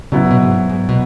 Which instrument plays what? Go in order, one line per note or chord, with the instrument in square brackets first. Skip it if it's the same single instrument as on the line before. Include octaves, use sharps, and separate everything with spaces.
[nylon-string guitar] C#3 [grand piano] F#3 B3 E4
[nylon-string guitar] B2
G#2
A#2
G#2
B2